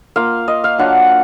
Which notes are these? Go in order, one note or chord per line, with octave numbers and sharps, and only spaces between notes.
A#3 F4 F5
D#5
F5
F#3 D4 F4 F#5